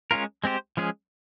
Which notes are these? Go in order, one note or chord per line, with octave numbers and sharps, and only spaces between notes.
G#3 C#4 F4 A#4
G#3 C4 G4 C5
F3 G#3 C#4 G#4